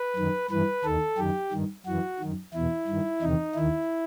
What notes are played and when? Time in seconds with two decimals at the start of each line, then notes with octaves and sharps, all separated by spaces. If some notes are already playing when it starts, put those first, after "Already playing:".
Already playing: B4
0.16 F#2 D#3
0.51 G2 E3 B4
0.84 D#2 D#3 A4
1.17 F#2 D#3 G4
1.52 G2 D#3
1.86 F#2 E3 F#4
2.19 F#2 D#3
2.54 E2 B2 E4
2.88 G2 D#3
3.22 E2 C3 D#3 D#4
3.55 D#2 D#3 E4